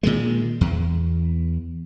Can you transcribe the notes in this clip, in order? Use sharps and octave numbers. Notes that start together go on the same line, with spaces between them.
A#2 D#3 G#3
E2